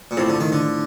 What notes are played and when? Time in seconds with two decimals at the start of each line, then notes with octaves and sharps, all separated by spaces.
0.11 A#2
0.17 A2 C3 F3 C4
0.29 D3
0.40 D#3
0.52 D3